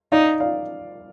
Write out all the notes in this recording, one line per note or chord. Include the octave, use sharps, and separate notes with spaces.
D#4 D5 F5
D5 F5